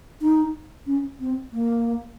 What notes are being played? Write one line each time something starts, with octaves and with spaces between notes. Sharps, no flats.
D#4
C#4
C4
A#3